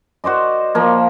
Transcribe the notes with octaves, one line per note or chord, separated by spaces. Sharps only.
F#4 C5 D5 D#5
F3 A#3